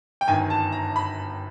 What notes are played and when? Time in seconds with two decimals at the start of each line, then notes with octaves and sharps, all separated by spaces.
0.21 G5
0.27 G1 F#2 D#3 G#5
0.50 A5
0.72 A#5
0.96 B5